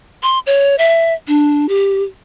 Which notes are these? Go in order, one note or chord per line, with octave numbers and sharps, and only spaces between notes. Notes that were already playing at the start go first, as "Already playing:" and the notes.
C6
C#5
E5
D4
G4